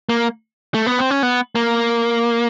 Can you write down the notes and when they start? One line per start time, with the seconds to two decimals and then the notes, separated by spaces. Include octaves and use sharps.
0.09 A#3
0.74 A3
0.86 B3
0.99 C4
1.11 C#4
1.23 B3
1.55 A#3